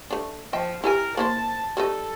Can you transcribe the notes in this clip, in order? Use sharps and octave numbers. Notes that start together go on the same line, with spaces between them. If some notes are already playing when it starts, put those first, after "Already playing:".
A3 D4
F3 D#5 E5 G5
E4 G4 A#4 G#5
A#3 E4 C5 A5
G3 A3 D#4 A4